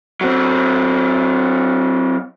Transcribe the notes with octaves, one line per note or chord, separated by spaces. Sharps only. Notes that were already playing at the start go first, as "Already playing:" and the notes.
F#3 C4